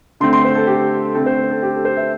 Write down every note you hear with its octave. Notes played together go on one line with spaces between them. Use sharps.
D3 A3 C4 C6
C6
C5
A4
G4
D3 A3 C4 A4
C5
A4
G4
A4
C5
E5